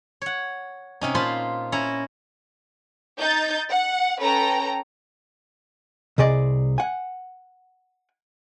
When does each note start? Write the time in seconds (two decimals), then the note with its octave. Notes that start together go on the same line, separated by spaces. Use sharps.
0.22 C#5 F#5
1.01 C3 C#4 D#4
1.15 A#2 F4 C5 A5 B5 C6
1.72 C#4 E4 A#5
3.19 D#4 G6 A6
3.70 F#5
4.19 C#4 A4 B4 G5 A#5
6.18 C2 C3 G#4 D5 D#5
6.78 F#5 G#5